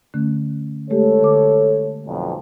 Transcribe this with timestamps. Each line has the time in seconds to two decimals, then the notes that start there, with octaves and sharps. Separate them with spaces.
0.14 D3 A3 C#4
0.90 G#3 A3 G4 A4 C#5
1.22 D3 D6
2.07 B1 F2